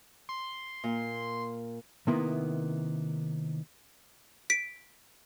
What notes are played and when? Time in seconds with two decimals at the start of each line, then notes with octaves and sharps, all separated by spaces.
0.29 C6
0.84 A#2
2.07 C3 D#3 A#3 B3 E4
4.50 B6 D7